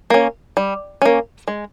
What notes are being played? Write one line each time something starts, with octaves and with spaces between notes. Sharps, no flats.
A#3 C#4
G3
A#3 C#4
G#3